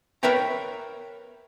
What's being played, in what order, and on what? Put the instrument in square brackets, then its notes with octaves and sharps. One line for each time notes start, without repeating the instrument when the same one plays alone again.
[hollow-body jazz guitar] A#4 B4 C#5 E5 G5 A#5